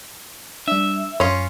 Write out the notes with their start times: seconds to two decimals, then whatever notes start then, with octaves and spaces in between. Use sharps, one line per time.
0.68 G3 D4 E5
1.20 F#2 C#4 F4